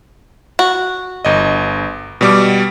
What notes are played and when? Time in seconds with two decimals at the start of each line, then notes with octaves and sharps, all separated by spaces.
0.59 F#4
1.25 G1 D#5
2.21 B2 G3 D6